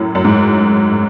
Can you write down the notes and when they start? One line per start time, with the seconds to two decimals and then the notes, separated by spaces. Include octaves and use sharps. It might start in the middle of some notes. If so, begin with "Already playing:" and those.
Already playing: F#2 A2
0.15 F#2
0.25 G#2